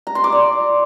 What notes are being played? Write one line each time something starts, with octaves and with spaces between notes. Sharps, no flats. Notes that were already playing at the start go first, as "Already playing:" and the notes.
A#5
C6
D6
D5